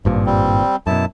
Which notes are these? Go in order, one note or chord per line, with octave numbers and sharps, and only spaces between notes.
G#1 G2 A#2 F3
G3 C4
F#2 B2 E4 A5